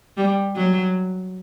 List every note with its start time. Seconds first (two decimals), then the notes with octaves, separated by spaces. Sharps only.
0.17 G3
0.56 F#3